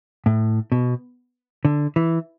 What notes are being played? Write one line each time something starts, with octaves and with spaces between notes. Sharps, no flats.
A2
B2
D3
E3